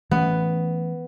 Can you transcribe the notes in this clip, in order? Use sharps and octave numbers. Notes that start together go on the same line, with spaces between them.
E3 A3 B3 C#4